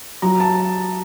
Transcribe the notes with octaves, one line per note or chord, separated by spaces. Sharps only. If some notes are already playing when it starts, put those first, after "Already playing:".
F#3 A#5
A5